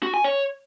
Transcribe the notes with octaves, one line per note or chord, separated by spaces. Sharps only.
F#4
G#5
C#5